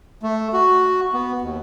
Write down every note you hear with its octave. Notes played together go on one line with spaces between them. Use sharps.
A3
F#4
B3
D#2